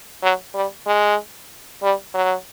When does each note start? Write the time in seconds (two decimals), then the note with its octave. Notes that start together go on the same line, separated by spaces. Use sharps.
0.23 F#3
0.55 G3
0.87 G#3
1.83 G3
2.14 F#3